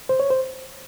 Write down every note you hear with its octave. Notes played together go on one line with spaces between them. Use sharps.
C5
C#5
C5